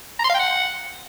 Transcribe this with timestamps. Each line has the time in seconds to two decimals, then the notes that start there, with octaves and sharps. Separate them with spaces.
0.19 A#5
0.24 C6
0.29 F5
0.34 G5
0.39 F#5